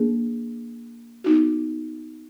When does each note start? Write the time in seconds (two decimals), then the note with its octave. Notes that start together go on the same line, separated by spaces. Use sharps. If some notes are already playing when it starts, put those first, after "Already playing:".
Already playing: A#3 D4 G#4
1.24 B3 D#4 F#4